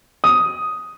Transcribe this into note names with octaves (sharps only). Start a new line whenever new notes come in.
D#6